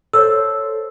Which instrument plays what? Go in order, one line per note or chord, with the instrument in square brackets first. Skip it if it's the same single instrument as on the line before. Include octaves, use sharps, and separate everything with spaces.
[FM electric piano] A4 C5 [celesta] C#5 E6